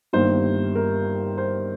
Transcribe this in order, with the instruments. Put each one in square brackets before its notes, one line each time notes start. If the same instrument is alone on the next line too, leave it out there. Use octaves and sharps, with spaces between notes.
[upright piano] G1 G2 D#3 A#3 C5
A#4
C5